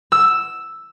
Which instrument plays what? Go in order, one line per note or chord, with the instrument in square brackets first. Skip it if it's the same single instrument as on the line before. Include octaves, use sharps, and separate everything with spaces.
[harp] E6